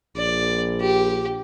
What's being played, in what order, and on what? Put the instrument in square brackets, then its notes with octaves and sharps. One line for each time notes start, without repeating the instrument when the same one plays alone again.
[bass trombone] A#1 [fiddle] D5
[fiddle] G4